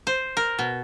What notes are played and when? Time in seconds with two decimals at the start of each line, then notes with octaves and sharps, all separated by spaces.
0.07 C5
0.37 A#4
0.59 B2